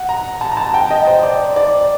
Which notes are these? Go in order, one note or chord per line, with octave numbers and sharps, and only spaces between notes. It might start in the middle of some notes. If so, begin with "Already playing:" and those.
Already playing: F#5
A#5
A5
A#5
A5
G5
D#5
C5
D5
D5